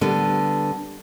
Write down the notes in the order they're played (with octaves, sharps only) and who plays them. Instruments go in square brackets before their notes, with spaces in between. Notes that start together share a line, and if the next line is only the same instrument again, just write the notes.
[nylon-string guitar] D3 G3 B3